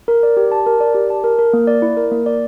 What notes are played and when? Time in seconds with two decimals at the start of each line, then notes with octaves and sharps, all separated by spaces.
0.08 A#4
0.23 D5
0.37 G4
0.52 A5
0.66 A#4
0.81 D5
0.95 G4
1.10 A5
1.24 A#4
1.39 A#4
1.53 A#3
1.67 D5
1.82 E4
1.97 A#4
2.12 A#3
2.26 D5